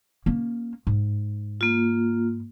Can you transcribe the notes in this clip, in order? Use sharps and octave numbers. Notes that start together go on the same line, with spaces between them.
A#3 C#4
G#2
A#3 F4